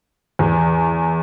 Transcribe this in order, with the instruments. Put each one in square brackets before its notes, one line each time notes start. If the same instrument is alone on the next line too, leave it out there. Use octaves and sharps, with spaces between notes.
[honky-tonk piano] E2